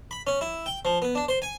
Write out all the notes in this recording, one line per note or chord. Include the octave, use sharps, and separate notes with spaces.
B5
C#4
E4
G5
F3
B3
D4
C5
G#5